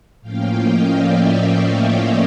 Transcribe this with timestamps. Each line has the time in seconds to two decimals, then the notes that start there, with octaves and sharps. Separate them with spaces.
0.22 A2 F3 A#3 C#4 F5 G5
0.54 D#5 F5
0.85 D5 E5
1.50 C#5 D#5